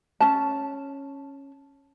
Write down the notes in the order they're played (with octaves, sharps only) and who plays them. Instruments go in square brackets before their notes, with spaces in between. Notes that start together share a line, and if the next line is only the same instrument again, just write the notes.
[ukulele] C#4 A5